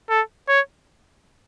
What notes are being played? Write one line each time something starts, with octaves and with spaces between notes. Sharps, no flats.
A4
C#5